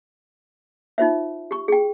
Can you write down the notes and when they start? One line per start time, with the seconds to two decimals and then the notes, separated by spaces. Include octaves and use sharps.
0.98 D#4 F4 C5 E5
1.51 G4 C#6
1.68 G#4 G5